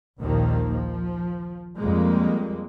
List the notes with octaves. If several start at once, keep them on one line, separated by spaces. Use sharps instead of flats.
A#1 D#2 A#2 D#3 F3 A#3
F3
F2 G3 G#3 A#3